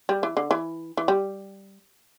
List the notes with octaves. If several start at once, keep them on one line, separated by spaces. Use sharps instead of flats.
G3
E3
D3
E3
E3
G3